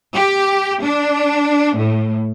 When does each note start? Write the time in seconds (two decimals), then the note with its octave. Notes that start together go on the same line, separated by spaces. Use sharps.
0.14 G4
0.82 D4
1.75 A2